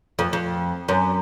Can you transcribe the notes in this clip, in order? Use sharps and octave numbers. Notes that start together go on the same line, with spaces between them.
F2
F2
F#2